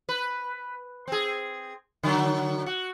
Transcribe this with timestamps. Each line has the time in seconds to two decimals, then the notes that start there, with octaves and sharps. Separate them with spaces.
0.09 B4
1.08 C4 G#4
2.03 D3 F#3
2.66 F#4